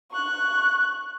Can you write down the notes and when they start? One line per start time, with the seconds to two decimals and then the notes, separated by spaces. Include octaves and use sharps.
0.12 C#6 F#6